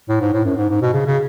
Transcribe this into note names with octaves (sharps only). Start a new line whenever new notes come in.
A2
G#2
A2
F#2
G#2
G#2
B2
C#3
C#3